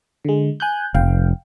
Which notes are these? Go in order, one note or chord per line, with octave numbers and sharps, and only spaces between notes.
D3 G#3
G#5 F#6 G6
F1 F5 G5